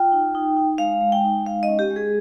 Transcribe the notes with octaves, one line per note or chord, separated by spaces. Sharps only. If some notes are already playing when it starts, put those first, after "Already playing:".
Already playing: F4 G5
D#4
D#4
D#4
G#3 F5
G#3
G5
D#4
G#3 F5
D#5
C#4
G4
G#3
G#4